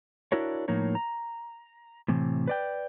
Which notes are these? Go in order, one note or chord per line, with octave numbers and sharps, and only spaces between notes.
D4 E4 F#4 A#4 C#5
A2 F3 A#3 D#4 C#5
A#5
A2 C3 E3
B4 D5 G5